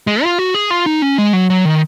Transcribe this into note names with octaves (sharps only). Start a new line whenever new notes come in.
G#3
F4
F#4
G#4
F4
D#4
C#4
G#3
F#3
F#3
D#3